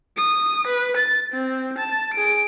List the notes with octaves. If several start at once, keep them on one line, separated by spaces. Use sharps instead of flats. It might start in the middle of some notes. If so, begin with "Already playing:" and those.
D#6
B4
A6
C4
A5
G#4 D7